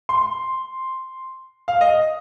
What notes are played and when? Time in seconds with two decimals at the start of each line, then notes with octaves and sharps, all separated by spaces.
0.09 C6
1.68 F5
1.81 D#5